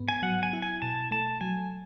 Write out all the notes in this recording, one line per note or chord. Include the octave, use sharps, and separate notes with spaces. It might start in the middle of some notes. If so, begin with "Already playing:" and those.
Already playing: G#2 B3
G#5
F#3 F#5
G#5
E4
G#5
B2 A5
A3 A5
F#3 G#5